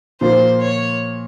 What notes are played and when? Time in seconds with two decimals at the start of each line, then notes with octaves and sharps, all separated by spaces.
0.21 A#2 F3 A#3 F4 C5
0.61 C#5